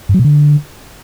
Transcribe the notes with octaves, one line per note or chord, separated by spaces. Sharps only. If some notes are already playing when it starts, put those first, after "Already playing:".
G2
F#3
B2
D3